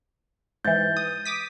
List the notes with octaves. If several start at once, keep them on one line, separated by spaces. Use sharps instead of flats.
G#2 E3 G6 A6
D#6
D6 D#6 B6